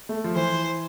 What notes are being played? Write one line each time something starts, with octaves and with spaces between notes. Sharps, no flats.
A3
F3
E3 C5